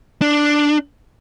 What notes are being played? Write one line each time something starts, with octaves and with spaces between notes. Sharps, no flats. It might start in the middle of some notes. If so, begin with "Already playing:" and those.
D4